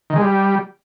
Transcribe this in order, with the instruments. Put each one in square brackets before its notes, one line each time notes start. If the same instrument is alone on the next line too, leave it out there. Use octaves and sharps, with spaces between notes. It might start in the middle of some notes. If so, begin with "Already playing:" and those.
[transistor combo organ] D#3
G#3
G3